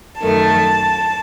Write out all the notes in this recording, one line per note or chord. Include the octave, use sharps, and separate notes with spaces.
F#2 D#3 A3 A5